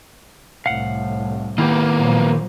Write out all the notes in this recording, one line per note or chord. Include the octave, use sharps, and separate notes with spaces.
C2 A2 F5 F#5
D#3 A#3 B3 E4 G4
A#2 F3 F#3